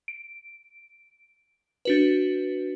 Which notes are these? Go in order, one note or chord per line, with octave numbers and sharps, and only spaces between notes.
D7
D4 F#4 B4